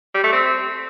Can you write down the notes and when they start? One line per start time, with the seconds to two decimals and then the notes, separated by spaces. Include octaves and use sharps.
0.14 G3
0.24 A3
0.33 C4